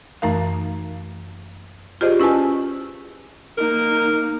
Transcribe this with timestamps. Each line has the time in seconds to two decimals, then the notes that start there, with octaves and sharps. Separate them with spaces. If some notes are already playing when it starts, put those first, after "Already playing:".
0.22 F#2 E3 A3 D#4 A#4 F5
2.01 F4 G4 G#4 C5 D5 D#5
2.20 C#4 E4 B4 G#5 A5
3.58 A#3 D#4 A#4